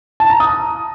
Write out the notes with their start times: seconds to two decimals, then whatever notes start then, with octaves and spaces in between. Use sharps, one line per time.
0.20 A5
0.30 A#5
0.40 D#6